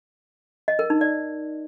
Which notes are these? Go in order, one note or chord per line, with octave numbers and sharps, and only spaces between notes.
D#5
A#4
D#4
D5